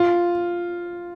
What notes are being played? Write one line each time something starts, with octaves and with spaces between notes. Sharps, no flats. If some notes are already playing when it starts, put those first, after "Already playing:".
Already playing: F4